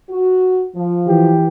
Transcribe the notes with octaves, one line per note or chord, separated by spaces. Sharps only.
F#4
F3
E3 G4